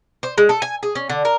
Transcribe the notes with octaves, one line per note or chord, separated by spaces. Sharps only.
C5
G#3
A4
G#5
G#4
C#4
D3
A#4